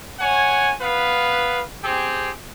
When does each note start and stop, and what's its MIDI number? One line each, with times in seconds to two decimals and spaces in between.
0.20 0.71 73
0.20 0.71 78
0.20 0.71 80
0.81 1.62 59
0.81 1.62 71
0.81 1.62 77
1.83 2.30 60
1.83 2.30 67
1.83 2.30 68